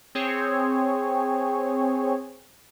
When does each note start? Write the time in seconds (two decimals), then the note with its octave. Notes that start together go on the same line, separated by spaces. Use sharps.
0.15 C4 G#4 C#5